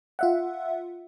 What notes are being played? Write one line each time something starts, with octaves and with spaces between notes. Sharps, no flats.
F4 E5 F#5